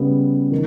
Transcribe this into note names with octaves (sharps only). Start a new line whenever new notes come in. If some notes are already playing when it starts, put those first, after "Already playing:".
Already playing: C#3 G3 B3
D#3